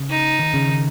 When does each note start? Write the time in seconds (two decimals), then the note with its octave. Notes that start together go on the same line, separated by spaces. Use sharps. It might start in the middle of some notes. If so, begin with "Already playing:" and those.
Already playing: C#3
0.10 D#4
0.39 D#3
0.54 C#3
0.69 D#3